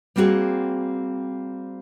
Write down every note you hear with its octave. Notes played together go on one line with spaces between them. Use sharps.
G3 A#3 C4 F#4 G#4